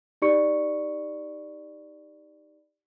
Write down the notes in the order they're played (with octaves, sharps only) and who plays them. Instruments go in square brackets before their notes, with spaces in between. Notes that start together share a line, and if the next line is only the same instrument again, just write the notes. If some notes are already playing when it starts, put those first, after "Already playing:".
[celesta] D#4 G4 D5 B5 C#6 C#7